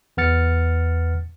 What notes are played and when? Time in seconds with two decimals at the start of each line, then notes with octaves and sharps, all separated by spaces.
0.17 E2 B4 F#5 F6 A6 C#7